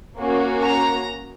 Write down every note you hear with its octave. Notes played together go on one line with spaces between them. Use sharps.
A#3 C#4 F#4
A#5